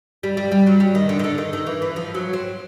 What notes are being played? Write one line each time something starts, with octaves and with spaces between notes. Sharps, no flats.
G3
G3
G3
F#3
G3
D#3
D3
D#3
D3
D#3
D#3
E3
E3
F3
F#3
C4